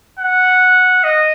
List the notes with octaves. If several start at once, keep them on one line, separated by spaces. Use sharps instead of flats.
F#5
D#5